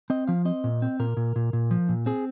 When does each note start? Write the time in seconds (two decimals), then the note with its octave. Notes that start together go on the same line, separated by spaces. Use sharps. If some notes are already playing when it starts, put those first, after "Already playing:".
0.10 C4 D#5
0.28 F3 F5
0.45 C4 D#5
0.64 A#2
0.82 C4
0.99 A#2 A#4
1.17 A#2
1.36 A#2
1.53 A#2
1.71 F3
1.89 A#2
2.06 C4 G#4